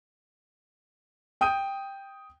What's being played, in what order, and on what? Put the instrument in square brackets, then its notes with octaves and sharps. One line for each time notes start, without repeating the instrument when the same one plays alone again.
[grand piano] G5 D#6 G6 D#7